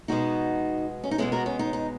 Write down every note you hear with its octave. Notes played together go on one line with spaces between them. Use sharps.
B2 G#3 B3 D#4 F#4
C#4
D#4
B2 G#3 B3 C#4 E4
F#4 A#4
C#4
D#4
D#4